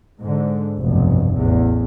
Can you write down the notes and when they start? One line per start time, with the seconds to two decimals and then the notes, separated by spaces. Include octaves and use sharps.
0.20 G#2 D3
0.79 F1 B1 G2
1.35 A1 E2